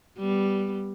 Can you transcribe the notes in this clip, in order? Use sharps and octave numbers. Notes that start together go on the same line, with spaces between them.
G3 B3